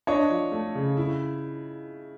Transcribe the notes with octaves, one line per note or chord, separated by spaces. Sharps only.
D4 C#5 D#5
F3
A3
C#3
E4